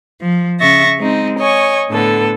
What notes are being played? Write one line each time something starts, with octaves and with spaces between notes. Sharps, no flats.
F3
C#3 E5 C#6 A6 A#6
G#3 C4 D#4
C#5 D#5 G#5 C#6
A2 D3 B3 A4